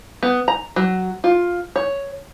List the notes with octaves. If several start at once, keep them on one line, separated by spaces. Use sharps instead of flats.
B3
A#5
F#3
F4
C#5